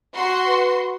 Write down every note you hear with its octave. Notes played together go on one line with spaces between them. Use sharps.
F#4 C6
B4